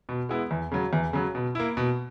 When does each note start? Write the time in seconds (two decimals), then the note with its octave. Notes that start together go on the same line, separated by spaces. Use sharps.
0.09 B2
0.29 G#3 B3 E4
0.51 E2
0.71 C#3 F#3
0.93 E2
1.13 C#3 F#3
1.35 B2
1.55 A#3 E4
1.77 B2